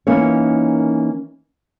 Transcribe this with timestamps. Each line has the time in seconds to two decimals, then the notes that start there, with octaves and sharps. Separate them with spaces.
0.07 E3 A#3 C#4 D#4 A#4 C#5